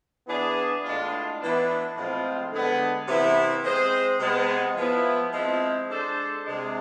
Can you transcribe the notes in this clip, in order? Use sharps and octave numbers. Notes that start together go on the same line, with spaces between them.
E3 B3 D4 G#4
A2 G#3 D4 F4
E3 B3 D4
A2 F3 G#3 C4 F4
D3 G#3 B3
C3 E3 B3 E4
G#3 C4 G#4 C5
C3 G#3 B3
F3 B3 E4
F3 G#3 C4 E4
G#3 D4 A4 C5
C3 G#3 D4